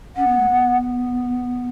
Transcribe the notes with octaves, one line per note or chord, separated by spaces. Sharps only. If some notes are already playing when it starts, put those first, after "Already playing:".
C#4 F#5
B3
A3
B3